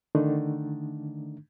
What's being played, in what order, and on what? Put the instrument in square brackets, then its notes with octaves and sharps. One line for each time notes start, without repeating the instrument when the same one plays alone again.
[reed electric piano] D3 D#3 A3 D4 D#4